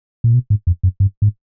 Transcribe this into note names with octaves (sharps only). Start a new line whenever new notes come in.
A#2
B2
G#2
F2
F#2
G2
G#2